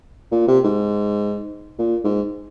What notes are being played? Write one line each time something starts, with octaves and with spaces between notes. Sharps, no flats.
A#2
C3
G#2
A#2
G#2